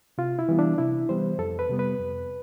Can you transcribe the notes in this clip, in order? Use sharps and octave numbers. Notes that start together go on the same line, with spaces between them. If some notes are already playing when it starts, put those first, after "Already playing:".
C3 F4
E4
E3 G3 B3
D4
C3 E4
E3 G3 B3 C5
F2 A4
B4
C3 G3 B3
B4
F2